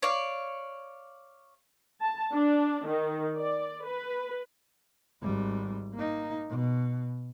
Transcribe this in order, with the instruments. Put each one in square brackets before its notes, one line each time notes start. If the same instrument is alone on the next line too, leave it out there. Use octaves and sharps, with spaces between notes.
[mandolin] C#5 D5 F5
[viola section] A5
D4
D#3
D5
B4
[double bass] G#1 G3
A#3 D#4
B2